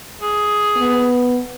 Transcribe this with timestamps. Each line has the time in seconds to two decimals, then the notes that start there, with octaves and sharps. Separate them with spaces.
0.21 G#4
0.76 B3